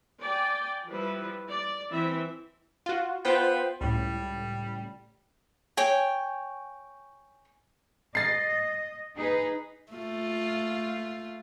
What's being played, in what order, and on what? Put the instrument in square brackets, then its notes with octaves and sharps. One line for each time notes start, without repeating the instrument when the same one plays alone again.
[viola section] D5 G5 G#5
F3 G3 E4 B4
D5
E3 C4 E5
[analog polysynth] F4 F#4
[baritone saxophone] B3 [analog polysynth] F4 C5 G5
[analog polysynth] C#2 A2 [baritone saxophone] G3
[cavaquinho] C#5 G5 G#5
[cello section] D#5 [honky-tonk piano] A6 C7
[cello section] D#4 G#4 B4
[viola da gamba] A3 F4